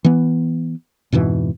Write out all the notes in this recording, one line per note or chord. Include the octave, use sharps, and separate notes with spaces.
E3 B3
F2 G#2 B2 E3